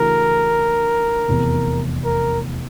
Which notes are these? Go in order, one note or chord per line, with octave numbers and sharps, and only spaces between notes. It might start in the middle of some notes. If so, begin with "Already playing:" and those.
Already playing: C#3 E3 A3 D4 F#4 A#4
F1 E2 C3
A#4